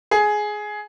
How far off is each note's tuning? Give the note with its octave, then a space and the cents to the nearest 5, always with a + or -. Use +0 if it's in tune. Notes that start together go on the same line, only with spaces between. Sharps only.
G#4 +10